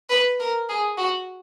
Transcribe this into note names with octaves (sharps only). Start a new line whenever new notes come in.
B4
A#4
G#4
F#4